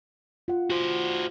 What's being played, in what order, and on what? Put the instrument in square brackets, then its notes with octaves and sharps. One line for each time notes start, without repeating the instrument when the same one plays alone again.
[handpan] F4 F#5
[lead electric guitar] F#4 C5